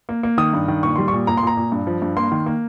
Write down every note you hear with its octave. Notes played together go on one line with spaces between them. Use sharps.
A#3
A#3
D#3 D#6
G2
D#3
A#2 C#6
G3 C6
C#6
A#2
A#2 A#5
C6
A#2 A#5
A#2
G2
F3
G2
A#3 C6
D#3
A#3